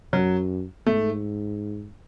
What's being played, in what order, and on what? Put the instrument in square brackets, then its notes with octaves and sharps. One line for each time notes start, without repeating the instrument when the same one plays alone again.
[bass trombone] F#2 [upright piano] F#3
[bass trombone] G#2 [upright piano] A3